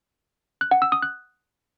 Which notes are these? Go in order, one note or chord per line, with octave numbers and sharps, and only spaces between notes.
F#6
F#5
E6
D#6
F#6